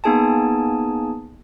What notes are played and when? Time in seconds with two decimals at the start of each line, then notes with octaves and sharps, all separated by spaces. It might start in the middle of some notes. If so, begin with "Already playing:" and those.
0.04 A#3 B3 D#4 G#4 G#5 A5